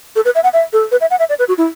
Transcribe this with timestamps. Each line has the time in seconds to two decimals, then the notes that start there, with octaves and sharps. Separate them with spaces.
0.16 A4
0.25 B4
0.35 E5
0.44 F#5
0.53 E5
0.73 A4
0.92 B4
1.01 E5
1.11 F#5
1.19 E5
1.29 D5
1.39 B4
1.48 F#4
1.58 E4